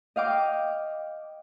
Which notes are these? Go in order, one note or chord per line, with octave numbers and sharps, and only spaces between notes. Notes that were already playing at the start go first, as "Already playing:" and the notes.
D#5 F5 G5 D6